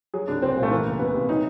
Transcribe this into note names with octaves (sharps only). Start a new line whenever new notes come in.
F#3 G#4
C2 D4
C2 C4
A#2
A3
E3 A#3
C#2
C#2 B3
C3
F#3 D#4